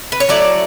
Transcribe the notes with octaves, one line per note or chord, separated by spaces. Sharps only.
B4
C#5
F#3 A3 E4 D5